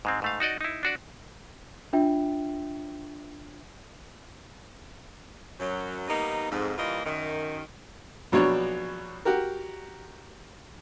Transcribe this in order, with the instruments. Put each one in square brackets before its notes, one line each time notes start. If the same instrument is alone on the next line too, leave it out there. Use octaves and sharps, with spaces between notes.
[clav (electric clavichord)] G#2 G#3 C4
G#2 A3 F5
D#4 F#4 D5 D#5
D#4 E4
D4 F#4 D5
[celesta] D4 F4 E5 G5
[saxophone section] F#2 F#3
G3 A#3 B3 D#4
F2 G#2
E3 G3 A#3 F4 D#5
F#2 D#3
[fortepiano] A#1 B2 F#3 D4 C#5
F#4 G4 A#4